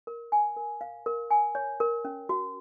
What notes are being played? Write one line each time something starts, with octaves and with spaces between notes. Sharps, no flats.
A#4
G#5
A#4
F5
A#4
G#5
C#5
A#4
C#4
F#4